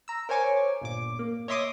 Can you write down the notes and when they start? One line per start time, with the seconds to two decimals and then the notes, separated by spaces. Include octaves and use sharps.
0.08 A#5 E6
0.29 A#4 C5 C#5 G#5 C#6 D6
0.81 G1 A#2 D6
1.19 A#3
1.48 C#5 D#5 E5 C6 D6 D#6